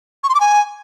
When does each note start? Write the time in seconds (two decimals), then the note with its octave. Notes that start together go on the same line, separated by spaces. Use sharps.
0.24 C#6
0.29 C6
0.35 D6
0.40 G#5